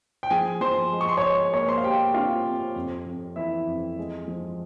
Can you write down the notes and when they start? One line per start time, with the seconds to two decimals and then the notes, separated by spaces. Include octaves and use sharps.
0.23 G5
0.30 F3 G#4 G#5
0.61 F3 C5 C6
0.92 G#3
1.01 C#6
1.09 C6
1.17 G#3 C#5 C#6
1.53 A#3 C#5 C#6
1.68 C5 C6
1.78 F5
1.83 A#3 G4 G5
2.14 C3 F4 F5
2.45 C3
2.76 F2
3.06 F2
3.36 E3 E4 E5
3.67 F2
3.98 G#3
4.28 F3